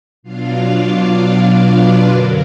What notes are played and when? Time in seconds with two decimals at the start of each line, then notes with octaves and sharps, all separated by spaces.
0.23 B2 F#3 D4 F4 F5
0.69 D4 D5
1.61 B4
2.07 F#2 D3 F#3 A#4